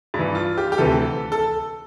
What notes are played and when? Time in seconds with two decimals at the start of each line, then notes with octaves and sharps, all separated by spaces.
0.14 G2
0.19 E3
0.35 F4
0.58 G4
0.72 G4
0.78 D2 C3 E3 A4
1.32 A4